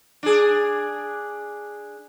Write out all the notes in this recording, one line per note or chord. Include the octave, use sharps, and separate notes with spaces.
D4 G#4